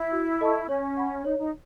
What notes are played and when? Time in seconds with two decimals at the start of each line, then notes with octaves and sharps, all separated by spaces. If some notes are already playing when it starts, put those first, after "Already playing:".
Already playing: E4
0.12 F#4
0.41 A4 D#5 A5 C#6
0.69 C#4 C#5
0.97 F#5 B5
1.25 D#4 C#5
1.39 D#4